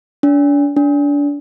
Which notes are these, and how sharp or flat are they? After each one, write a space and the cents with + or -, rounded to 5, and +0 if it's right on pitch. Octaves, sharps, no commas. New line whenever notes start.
D4 -40
D4 -30